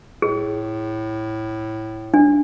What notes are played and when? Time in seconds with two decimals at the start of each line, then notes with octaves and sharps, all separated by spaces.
0.22 A2 G#4
2.14 D4